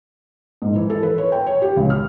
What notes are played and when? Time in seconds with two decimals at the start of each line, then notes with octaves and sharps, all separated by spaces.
0.62 G#2
0.75 E3
0.90 A4
1.03 B4
1.18 C#5
1.32 G5
1.46 C#5
1.62 G4
1.77 C#2
1.90 F6